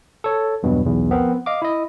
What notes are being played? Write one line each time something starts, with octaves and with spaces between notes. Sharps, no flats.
A4 C#5
E2 G2 B2 F#3
B1 E2
F3 B3 C4 A#4 C5
D#5 F5 D6
E4 D#5